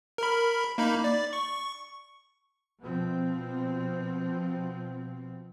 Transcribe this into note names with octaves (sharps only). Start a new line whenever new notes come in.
A#4 B5
A#3 D#4 B5
D5
C#6
B2 F3 C4